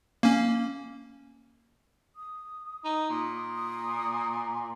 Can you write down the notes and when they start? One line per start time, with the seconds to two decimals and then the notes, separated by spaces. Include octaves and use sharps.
0.23 A#3 C#4
2.16 D#6
2.84 D#4
3.10 A#2 D#6
3.53 D#6